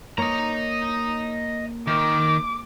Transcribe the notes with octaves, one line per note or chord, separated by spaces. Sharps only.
A#3 C#5 D#5 A#5
D#3 D6